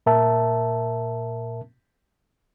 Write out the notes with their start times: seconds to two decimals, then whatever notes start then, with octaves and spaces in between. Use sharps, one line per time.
0.06 A#2 A#4 E5 A5